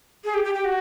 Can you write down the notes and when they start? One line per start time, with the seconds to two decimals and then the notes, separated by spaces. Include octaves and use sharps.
0.25 G#4
0.34 G4
0.44 G4
0.54 G4
0.65 F#4